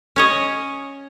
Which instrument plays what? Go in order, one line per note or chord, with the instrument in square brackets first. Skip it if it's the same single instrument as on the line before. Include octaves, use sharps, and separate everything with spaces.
[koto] C#4 C#5 D#5